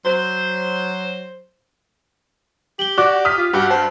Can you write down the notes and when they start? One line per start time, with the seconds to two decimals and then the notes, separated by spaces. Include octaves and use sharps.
0.05 F#3 C5
2.79 G4 F#7 G7
2.98 F#4 D5 D6 F#6
3.25 D#6 F6 B6
3.37 F4
3.53 G2 F#4 G4
3.70 C5 A5